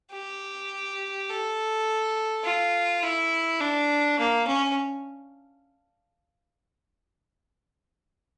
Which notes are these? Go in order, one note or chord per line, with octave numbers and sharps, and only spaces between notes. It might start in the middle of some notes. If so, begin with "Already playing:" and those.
G4
A4
F4
E4
D4
A#3
C#4